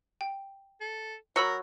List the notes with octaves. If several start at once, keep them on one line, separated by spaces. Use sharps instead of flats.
G5
A4
F#3 A#4 B5 E6 C#7